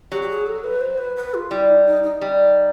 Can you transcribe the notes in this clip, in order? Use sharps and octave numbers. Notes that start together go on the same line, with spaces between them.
F#3 G4
G4
G#4
A4
B4
C5
B4
B4
F4
G3 E4
D#4
D#4
D#4
G3